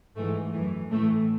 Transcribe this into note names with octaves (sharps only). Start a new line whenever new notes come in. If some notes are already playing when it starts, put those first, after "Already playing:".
G#2 E3 A3
F#2 E3
A2 E3 A3